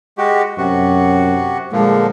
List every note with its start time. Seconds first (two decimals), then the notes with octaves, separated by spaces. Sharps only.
0.18 G#3 F#4 G4
0.57 F#2 C3 F#4
1.72 A#2 D3 F3 G#3